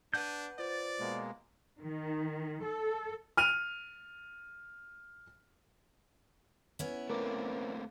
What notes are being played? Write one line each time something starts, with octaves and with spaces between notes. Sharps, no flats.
D4 B4 F#5 G6
F4 C5 D5 A6
B2 G#3 A#3
D#3
A4
F6 D#7 F7
B3 C#4 E4
A3 A#3 C4 A#4 B4 D6